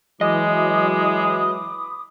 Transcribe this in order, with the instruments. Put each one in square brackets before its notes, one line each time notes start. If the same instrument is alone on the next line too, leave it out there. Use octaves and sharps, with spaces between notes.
[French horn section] E3 F#3 [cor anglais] G#3 [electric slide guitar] D#5 [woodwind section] B5 D6 D#6